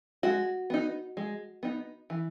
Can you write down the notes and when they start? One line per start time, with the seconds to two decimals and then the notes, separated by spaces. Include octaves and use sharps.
0.23 G#3 F#4
0.70 B3 D#4
1.17 G#3
1.63 B3 D#4
2.10 E3